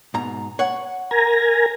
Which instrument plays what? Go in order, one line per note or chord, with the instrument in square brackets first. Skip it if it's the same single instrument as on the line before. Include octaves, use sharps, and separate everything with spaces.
[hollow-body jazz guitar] G#2 B2 A#5
C#5 F#5
[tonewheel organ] A#4 G#5 A#5